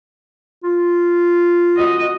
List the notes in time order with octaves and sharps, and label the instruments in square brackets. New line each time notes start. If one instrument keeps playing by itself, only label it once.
[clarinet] F4
[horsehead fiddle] F#4 D#5